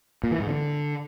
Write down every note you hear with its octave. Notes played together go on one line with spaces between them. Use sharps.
A#2
E3
G#2
D3